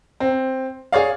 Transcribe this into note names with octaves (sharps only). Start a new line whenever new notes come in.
C4
G#4 C#5 D5 F5